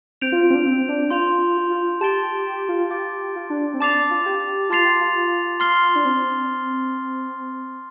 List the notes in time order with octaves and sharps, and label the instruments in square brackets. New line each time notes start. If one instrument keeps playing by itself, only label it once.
[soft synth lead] C4 [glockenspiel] G6 D7 F7
[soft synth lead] F4
F4
C4
D4
C4
D4
[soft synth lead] F4 [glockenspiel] C6 G6 D7 F7
[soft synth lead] F4
F4
[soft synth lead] G4 [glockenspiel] A5 C6 A6 D7 G7
[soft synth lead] G4
F4
[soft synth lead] G4 [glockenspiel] D6 A6 D7
[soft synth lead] F4
D4
C4
[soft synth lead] D4 [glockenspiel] A5 D6 A6 C7 F7
[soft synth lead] D4
F4
G4
[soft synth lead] F4 [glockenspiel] A5 C6 A6 C7 F7
[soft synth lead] G4
F4
[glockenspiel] C6 F6 C7 G7
[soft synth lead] D4
C4